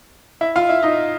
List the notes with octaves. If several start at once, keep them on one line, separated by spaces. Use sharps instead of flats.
E4 E5
F4 F5
E4 E5
D#4 D#5